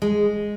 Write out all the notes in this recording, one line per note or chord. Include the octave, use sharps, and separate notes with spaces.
G#3